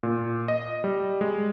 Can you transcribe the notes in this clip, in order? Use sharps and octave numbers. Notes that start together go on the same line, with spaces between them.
A#2
D#5
G3
G#3